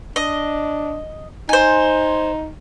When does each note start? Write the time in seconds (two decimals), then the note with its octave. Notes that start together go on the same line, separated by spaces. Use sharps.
0.16 D4 D#5
1.49 D#4 C5 G#5